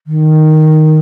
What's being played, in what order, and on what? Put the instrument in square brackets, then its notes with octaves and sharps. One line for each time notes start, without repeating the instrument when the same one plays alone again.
[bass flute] D#3